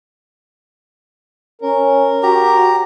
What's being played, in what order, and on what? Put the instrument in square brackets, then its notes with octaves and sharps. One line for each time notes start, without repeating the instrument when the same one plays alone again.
[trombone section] C#4 [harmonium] A#4
[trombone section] F#4 [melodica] G4 A#5